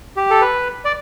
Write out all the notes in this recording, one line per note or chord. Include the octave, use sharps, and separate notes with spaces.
G4
A4
B4
D5